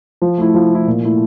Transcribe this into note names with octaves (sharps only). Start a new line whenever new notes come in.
F3
A3 E4
F3
A3 E4
A#2
A3 E4